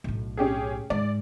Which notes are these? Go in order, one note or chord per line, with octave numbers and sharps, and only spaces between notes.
B1 A2
C#4 G4 G#4
G#2 D5